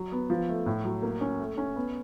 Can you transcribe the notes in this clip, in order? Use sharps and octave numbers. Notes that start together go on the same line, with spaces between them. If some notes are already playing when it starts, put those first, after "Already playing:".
Already playing: F#3
B3
F3
A3
A2
F#3
A#3
C#4
A3
C#4
B3